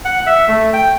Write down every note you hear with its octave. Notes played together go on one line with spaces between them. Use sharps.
F#5
E5
A3
G5